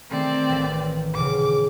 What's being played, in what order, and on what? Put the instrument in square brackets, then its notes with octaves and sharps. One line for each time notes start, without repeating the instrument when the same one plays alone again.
[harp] D#3 A3 [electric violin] C4 D5
[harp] A1 B6
[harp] D#1 C#3 [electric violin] D6